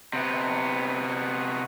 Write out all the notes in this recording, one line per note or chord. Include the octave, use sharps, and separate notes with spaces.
C3 B3